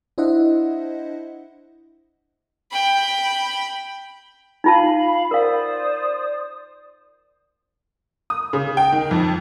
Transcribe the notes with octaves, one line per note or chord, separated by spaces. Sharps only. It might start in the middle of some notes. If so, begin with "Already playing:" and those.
D4 E4 C5 D#5 E5 F#5
G5 B5
D#4 F4 F5 A5 B5
A#4 C5 D5 F5 D#6
D#6
C#3
G5
D#3
F2